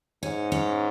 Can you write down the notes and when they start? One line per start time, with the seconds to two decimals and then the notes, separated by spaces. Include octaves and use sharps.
0.23 G#2 C#4
0.52 C#4